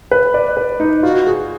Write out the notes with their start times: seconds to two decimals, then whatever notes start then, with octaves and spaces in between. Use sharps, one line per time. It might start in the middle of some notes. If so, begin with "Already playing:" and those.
0.11 B4
0.34 D5
0.57 B4
0.80 D#4
1.03 F4 F#4
1.27 G#4